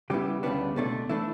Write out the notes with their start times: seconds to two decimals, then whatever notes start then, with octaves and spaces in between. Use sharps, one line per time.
0.10 C#3 G3 B3 E4 G4
0.43 D2 C#3 G3 B3 D4
0.76 C#2 B2 A3 D4
1.09 E3 A3 D4 E4